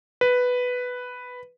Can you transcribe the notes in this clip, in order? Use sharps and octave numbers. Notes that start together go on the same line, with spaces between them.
B4